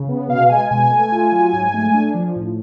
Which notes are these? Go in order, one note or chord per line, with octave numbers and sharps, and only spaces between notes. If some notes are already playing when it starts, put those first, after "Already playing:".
Already playing: C#3
B3
B2 F5
G#3 G#5
B2 G#5
A3
F4
F#3
G#2
A3
D4
F3
A2